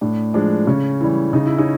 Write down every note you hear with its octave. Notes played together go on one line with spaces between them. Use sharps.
A2 D4
F3 G#3 D4
C#3 C#4
E3 G3
C#3 D#4
E4
C#4 D#4